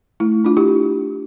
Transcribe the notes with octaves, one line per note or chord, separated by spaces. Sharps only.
A3 E4
D4 F4
E4 G4
D4